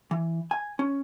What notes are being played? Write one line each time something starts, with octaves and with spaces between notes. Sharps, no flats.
E3
G#5
C#4